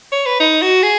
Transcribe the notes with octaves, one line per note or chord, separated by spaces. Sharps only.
C#5
B4
D#4
F#4
G#4